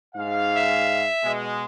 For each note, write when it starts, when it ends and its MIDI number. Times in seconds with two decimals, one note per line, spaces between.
0.15 1.06 44
0.15 1.06 77
0.55 1.32 76
1.23 1.65 47
1.23 1.65 56